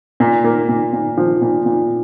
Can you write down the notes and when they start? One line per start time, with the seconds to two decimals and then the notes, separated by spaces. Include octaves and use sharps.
0.20 A#2
0.44 A#3
0.69 A#2
0.93 A#2
1.17 F3
1.42 A#2
1.66 A#2